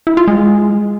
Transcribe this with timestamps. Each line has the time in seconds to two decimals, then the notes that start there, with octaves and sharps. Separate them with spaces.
0.07 E4
0.17 F4
0.28 G#3